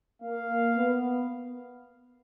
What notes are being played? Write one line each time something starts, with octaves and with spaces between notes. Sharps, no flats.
A#3 F5
B3